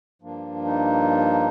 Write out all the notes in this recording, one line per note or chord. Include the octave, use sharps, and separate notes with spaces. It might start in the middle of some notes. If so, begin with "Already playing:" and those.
G2 F3 A#3 D4
D#4